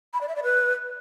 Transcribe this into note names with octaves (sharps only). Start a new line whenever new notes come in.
B5
D5
E5
D5
B4